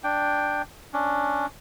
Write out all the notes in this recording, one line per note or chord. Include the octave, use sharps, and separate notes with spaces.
D4 G5
C#4 D4